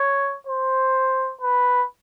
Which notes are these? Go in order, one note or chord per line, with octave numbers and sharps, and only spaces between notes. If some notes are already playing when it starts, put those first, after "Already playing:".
Already playing: C#5
C5
B4